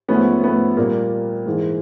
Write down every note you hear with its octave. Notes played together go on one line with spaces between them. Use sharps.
G#2 F3 A3 B3 C#4
A3 B3
A#2 G3 A#3
G#2 E3 G#3